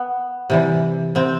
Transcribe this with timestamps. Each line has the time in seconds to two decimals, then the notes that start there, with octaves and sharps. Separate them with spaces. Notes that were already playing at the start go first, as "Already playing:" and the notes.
Already playing: B3
0.50 C3 E3 G3
1.15 C3 C4